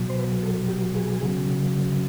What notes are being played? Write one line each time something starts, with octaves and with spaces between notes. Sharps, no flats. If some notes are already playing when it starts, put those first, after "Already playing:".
Already playing: B2 F#3
C5
B4
A4
G4
G#4
C#3 F#3